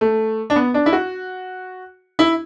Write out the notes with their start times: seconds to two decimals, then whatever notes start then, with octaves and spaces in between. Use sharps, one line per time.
0.01 A3
0.50 D4
0.56 B3
0.74 D4
0.86 E4
0.92 F#4
2.19 E4